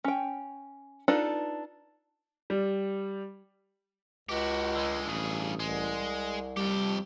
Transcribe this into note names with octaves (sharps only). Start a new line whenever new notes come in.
C#4 G5
D4 D#4 F4 A4 B4
G3
C#2 F#4 G4
D3 G#3
A1 G2 G#4
C2 G#3
F2 G3 G4